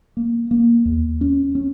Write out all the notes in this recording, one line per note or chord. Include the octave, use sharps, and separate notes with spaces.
A#3
A#3
D#2
C#4
C#4